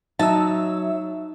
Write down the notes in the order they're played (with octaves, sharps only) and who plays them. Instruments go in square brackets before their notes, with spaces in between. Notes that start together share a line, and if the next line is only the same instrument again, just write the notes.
[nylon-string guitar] F#3 [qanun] D#4 [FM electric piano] E5 E6 [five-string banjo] A5